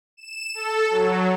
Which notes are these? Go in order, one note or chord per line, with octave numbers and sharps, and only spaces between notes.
E7
A4
F#3